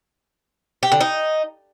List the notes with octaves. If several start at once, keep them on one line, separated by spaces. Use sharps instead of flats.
G4
D3
D#4